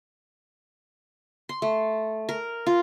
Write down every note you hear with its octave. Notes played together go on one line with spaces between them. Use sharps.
C6
A3
A#4
F4